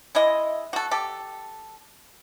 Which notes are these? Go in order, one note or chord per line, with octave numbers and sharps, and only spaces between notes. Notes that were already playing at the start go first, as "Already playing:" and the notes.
G#3 E4 D#5
F#4 A4
G4 A4